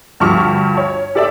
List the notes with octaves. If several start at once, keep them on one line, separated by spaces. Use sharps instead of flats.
D2 G2 D3 F3 C#6 F6
C#5
G4 A4 D5 E5 D6